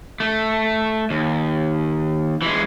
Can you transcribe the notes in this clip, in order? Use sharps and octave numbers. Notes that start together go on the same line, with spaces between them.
A3
D#2
E3 G#3